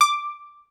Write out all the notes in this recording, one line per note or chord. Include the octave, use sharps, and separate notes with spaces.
D6